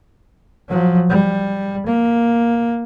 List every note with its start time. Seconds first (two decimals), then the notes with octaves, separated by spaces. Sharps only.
0.68 F3 F#3
1.09 G3
1.87 A#3